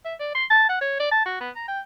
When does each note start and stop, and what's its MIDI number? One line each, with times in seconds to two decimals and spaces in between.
0.05 0.14 76
0.20 0.30 74
0.35 0.45 84
0.50 0.65 81
0.69 0.78 78
0.81 0.99 73
1.00 1.09 74
1.11 1.25 81
1.25 1.38 66
1.40 1.50 59
1.56 1.67 82
1.68 1.80 79